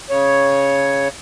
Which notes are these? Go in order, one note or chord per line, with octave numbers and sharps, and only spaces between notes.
C#3 C#5